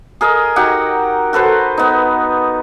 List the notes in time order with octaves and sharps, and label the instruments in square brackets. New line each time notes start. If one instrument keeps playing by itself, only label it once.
[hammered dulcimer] G#4 A#4 D#5
D#4 F#4 G4 F#5
F#4 A4 B4 C5
B3 D#4